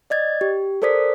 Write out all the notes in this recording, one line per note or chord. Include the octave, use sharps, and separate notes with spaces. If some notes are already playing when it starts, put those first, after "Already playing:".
D5 D#5 G#6 A6
G4
A4 A#4 C5 D5 D#6 B6